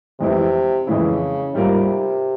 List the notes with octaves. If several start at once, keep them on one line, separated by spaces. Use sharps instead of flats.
F2 C3 E3 G#3 E4
F2 C#3 E3 G#3 E4
G#2 C3 G3 A#3 F4 A#4